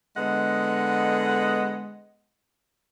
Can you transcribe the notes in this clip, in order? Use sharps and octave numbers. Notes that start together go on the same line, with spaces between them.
D3 G#3 B3 D#5 F#5